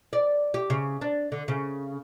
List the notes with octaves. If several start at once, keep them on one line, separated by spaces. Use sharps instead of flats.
D5
G4
C#3
D4
D3
C#3